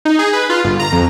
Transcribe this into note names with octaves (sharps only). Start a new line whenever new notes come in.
D#4
G#4
B4
F4
G1
A#5
F2